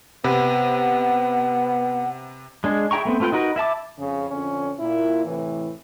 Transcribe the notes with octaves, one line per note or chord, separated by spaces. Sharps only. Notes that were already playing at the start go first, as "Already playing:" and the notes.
C3 B3 B4 F#5
G#3 D4 G#4
E4 G#4 G5 A#5 C#6
A3 B3 C4
A3 C4 F4 B4 G5
D#4 F#4 A#4 B4
E4 E5 A5 D6
F2 C#3
F2 D3 C4 C#4
A#2 E4
A2 C3 E3